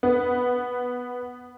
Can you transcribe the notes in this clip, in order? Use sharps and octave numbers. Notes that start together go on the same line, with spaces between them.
B3